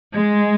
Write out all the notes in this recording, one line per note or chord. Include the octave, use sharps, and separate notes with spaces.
G#3